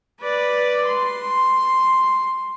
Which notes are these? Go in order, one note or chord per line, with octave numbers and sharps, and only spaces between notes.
B4 D5
C6